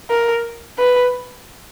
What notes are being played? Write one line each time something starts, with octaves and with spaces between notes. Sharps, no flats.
A#4
B4